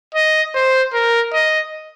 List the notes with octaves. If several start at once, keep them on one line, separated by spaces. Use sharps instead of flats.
D#5
C5
A#4
D#5